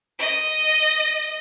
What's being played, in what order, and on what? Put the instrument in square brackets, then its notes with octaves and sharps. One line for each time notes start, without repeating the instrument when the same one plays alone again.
[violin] D#5